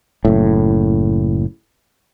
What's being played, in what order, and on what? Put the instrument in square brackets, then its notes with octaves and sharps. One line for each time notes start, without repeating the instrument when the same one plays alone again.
[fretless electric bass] F#1 A2